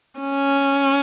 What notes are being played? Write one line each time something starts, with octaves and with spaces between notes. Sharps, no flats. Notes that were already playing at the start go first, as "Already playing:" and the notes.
C#4